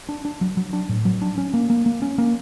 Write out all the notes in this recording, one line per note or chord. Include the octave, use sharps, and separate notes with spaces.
D4
D4
F#3
F#3
D4
A2
F#3
D4
C#4
A#3
A#3
A#3
C#4
A#3